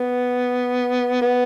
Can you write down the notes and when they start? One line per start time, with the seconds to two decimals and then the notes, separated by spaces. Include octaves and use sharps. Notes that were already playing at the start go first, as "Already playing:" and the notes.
Already playing: B3
1.21 B3